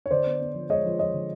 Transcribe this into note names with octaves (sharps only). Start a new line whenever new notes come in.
C#5
D3 C5 D5
B3
B3
F3
G#3 C#5 D#5
F3
F3 C#5 D#5
D3